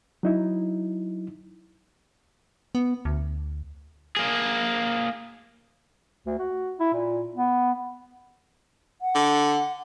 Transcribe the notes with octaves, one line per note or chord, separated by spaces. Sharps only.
F#3 D#4 E4
B3
D2
A#3 G#4
D2
F#4
E4
A#2
B3
F#5
D3